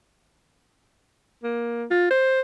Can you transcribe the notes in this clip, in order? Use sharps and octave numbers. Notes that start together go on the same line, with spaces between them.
A#3
F4
C5